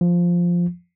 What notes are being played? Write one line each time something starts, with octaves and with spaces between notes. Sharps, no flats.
F3